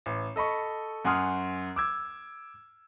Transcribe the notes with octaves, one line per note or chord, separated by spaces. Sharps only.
A1
A4 D#5 B5 C#6
F#2 F#5 G#5 C6 D#6 F6
D6 E6 G#6